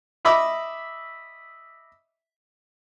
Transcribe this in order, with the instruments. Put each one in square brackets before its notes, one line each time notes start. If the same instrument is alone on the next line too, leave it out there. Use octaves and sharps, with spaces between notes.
[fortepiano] D#5 E5 B5 D6 E6